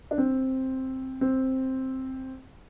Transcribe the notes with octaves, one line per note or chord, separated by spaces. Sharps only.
D4
C4
C4